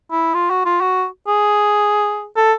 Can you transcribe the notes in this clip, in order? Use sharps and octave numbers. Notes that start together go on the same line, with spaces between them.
E4
F4
F#4
F4
F#4
G#4
A4